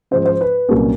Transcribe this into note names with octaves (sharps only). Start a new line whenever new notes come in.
G#2 F3 G#3 C#4 C5
C5
B4
C2 A#2 F#3 A#3 C#4 A#4